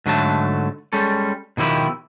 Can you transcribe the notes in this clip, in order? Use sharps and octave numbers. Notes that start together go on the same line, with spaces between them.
G#2 D3 F#3 A3 A5
G3 G#3 C#4 A4
B2 D#3 F3 E4 G4